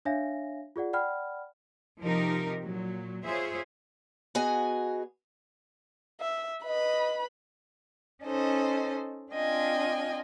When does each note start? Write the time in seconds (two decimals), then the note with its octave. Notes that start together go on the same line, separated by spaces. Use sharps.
0.05 D4 C#5 E5 F5 G#5 A#6
0.76 F4 G#4 D5 F#5
0.93 D5 F#5 G5 B5 F6
2.00 C3 F3 D#4 G4 A#4
2.62 A#2 F#3
3.25 F4 G#4 C5 C#5 E5
4.35 B3 F#4 G#4 D#5 G#5
6.20 E5
6.64 B4 D#5 B5
8.23 C#4 D#4 A4 C5 D#5
9.32 C4 D4 F4 D#5 G5 G#5